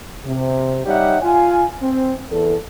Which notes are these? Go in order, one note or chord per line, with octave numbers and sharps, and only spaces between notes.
C3
G3 D#4 G4 C#5 E5 F#5
F4 G#5
C4
E2 A4